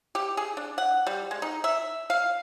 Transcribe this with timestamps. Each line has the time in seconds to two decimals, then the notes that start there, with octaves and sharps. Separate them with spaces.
0.15 G4
0.37 G#4
0.57 D4
0.78 F#5
1.07 G3
1.31 G#3
1.42 D#4
1.64 E5
2.10 F5